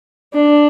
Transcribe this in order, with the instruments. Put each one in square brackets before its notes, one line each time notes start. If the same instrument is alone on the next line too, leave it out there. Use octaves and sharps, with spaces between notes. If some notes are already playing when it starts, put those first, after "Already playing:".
[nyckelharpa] D4